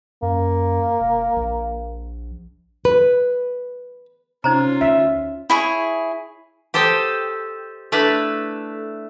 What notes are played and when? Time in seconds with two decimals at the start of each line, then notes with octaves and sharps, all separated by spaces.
0.22 F#2 A#3
1.00 E1
1.36 A#1
2.85 B4
4.44 C3 C#4 D#4 F4 C5 A#5
4.81 D2 E5
5.50 E4 G#4 C#5
6.74 G4 A4 C5 D#5 G5
7.92 A3 D4 E4 B4